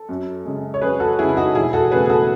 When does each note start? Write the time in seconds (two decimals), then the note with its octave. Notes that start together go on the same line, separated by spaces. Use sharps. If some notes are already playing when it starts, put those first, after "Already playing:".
Already playing: A4
0.09 F#2
0.45 C#3 G#3
0.74 C#5
0.82 F#2 G#4 B4
1.00 F#4 A4
1.19 C#3 G#3 E4 G#4
1.29 E4
1.37 D#4 F#4
1.55 E1 E4 G#4
1.73 F#4 A4
1.92 E2 C#3 E3 A3 G#4 B4
2.06 G#4
2.09 F#4 A4